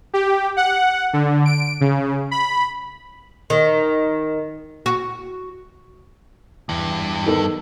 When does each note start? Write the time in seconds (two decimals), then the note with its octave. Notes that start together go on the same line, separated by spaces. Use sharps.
0.14 G4
0.57 F#5
1.13 D3
1.46 D7
1.81 C#3
2.31 B5
3.50 D#3
4.86 F#4
6.69 E2 G2
7.26 D#3 B3 A4